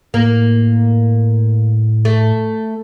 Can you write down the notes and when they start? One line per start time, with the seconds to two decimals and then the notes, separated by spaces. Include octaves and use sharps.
0.14 A2 A#3
2.05 A3